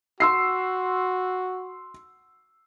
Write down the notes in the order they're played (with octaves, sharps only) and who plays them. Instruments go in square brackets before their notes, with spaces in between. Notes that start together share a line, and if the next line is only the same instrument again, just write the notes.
[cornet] F#4 [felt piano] C6 E6 C7